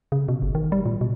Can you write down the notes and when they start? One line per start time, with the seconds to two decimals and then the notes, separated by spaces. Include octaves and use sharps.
0.12 C#3
0.28 B2
0.42 G1
0.55 D#3
0.72 G3
0.86 A#2
1.01 B2